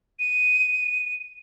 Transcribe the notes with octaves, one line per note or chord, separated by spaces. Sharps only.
D#7